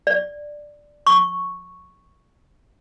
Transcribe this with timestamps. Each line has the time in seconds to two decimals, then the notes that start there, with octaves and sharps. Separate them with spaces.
0.07 D5
1.07 C#6